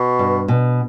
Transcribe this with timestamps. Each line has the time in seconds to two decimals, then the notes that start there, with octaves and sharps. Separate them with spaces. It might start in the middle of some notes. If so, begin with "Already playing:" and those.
Already playing: B2
0.19 G2
0.48 B2